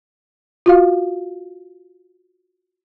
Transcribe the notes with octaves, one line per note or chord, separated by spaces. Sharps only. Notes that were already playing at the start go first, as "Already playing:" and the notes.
F4 F#4 F5